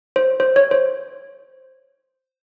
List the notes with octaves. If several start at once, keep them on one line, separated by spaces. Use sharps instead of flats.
C5
C5
C#5
C5